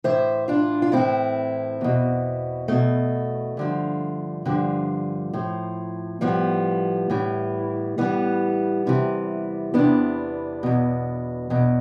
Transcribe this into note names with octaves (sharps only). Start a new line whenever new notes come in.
A2 E3 C5 E5
D4 F4
F4
A2 E3 C4 E4
E2 B2
E2 B2 A3
G2 D3 F3
G2 D3 F3
A2 F3
A2 F3 G3 B3
A2 E3
A2 E3 G3 B3
E2 C3 E3
E2 C3 E3 B3 D4
E2 B2
E2 B2